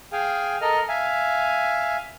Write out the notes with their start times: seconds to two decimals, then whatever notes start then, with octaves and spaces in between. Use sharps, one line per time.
0.12 G#4 F5 G5 G#5
0.61 A4 A#4 D#5 F6
0.89 E5 F5 G#5